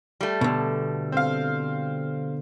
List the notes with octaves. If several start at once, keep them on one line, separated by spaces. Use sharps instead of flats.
G3 A3
B2 D3
C4 F5